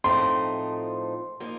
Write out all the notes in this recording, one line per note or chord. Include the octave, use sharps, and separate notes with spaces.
A2 F3 A3 C4 D#4 C6
F3 A#3 D#4